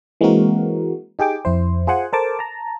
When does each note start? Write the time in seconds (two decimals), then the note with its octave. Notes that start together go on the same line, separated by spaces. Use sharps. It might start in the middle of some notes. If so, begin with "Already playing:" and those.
0.21 E3 G#3 A#3 C4 F#4 A#4
1.19 D#4 G4 G#4 G5 D6
1.45 F2 E4 C5
1.87 F4 G#4 C5 F#5 G#5
2.13 A4 A#4 C5 A5 D6
2.39 A5 A#5